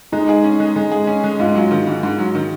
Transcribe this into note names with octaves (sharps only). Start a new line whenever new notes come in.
G#3 D#4
G#4
C#4
G#3
G#3
G#4
C#4
G#3
G#2 F4
F#3
D#3
G#2
G#2
F#3
D#3